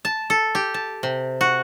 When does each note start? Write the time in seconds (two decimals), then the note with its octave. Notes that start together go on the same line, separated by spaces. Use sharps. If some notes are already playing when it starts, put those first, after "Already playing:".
0.05 A5
0.30 A4
0.55 G4
0.74 A5
1.03 C3
1.41 F#4